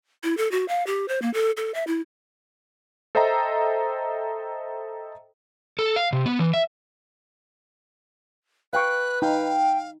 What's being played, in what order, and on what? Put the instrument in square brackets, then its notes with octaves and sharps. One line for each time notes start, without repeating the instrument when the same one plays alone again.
[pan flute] E4
A4
F#4
F5
G4
C5
A#3
A4
A4
E5
E4
[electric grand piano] A4 C5 D#5 E5 G5 A#5
[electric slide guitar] A4
F5
C3
B3
E3
E5
[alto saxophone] B4 [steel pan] F5 G5 C#6 [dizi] F#6
[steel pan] D#4 [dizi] F5 [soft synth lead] G5